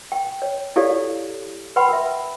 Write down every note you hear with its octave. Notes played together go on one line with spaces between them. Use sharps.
G5
C#5
E4 G4 A4 C#5 D5 F5
B4 F#5 G5 B5 C6
A#4 E5